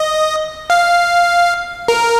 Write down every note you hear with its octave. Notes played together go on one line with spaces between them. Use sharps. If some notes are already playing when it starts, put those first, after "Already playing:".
Already playing: D#5
F5
A#4